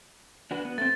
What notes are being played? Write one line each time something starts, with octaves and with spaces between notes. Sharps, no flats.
D4 F#4 B4
B3
A3 C4 A6